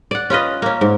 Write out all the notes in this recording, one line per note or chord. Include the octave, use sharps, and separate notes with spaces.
D5 F#5
C#4 F4 B4 D#5
A#3 C#4
G#2